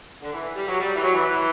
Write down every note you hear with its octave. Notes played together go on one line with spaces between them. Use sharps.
D3
E3
G3
F#3
G3
E3
F#3
E3